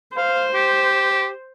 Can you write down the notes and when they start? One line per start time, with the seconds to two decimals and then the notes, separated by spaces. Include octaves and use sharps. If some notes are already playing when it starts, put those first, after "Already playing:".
0.17 C5 F5
0.54 G4